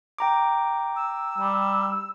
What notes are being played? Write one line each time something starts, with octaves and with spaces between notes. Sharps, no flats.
G5 A#5 D6
E6
G3